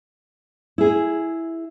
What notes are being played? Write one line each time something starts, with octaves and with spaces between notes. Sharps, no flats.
E4 G#4